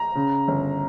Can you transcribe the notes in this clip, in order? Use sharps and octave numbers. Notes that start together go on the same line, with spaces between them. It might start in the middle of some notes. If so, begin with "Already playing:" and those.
Already playing: A#5
C#3
G1